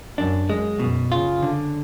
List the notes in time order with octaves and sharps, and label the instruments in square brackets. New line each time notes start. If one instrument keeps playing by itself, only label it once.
[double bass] F#2 [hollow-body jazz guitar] D4
[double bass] F#2 [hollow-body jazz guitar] G#3
[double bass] F#2 [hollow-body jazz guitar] B2
[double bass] C#3 [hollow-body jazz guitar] F4
[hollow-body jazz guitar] D3